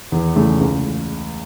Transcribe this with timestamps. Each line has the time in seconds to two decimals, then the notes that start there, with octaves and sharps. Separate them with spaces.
0.12 E2
0.36 C#3 E3 A3
0.60 C#2